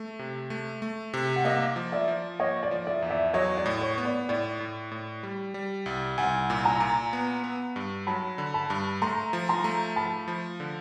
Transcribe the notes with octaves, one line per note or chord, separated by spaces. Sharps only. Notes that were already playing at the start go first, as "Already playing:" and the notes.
Already playing: A3
C3
A3
A3
C3
F#5
A#3 D#5 F5
F3
D5 E5
F3
A#3 C#5 D#5
D5
F3
D5 E5
E2
D5 E5
F#3 C#5 D#5
D5
A2
C#5
B3
D5
A2 D5
A2
A2
G3
G3
C2
C2 F#5 G#5
A#2
G#5 A#5
A#2
B3
B3
G2
F#3 A5 B5
D3
A5 B5
G2
A3 A#5 C6
F3
A#5 C6
A3
F3 A5 B5
F3
D3